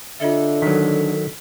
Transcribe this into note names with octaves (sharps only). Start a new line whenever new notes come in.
D3 F4 A4 D#5 E5
D#3 F#3 B6